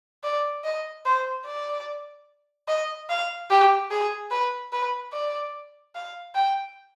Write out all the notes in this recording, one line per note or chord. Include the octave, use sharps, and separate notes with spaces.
D5
D#5
C5
D5
D#5
F5
G4
G#4
B4
B4
D5
F5
G5